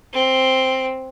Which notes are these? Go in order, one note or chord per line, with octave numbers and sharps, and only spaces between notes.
C4